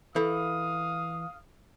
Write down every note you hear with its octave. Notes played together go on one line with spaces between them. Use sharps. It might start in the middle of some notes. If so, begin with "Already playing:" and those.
E3 A4 F5 D#6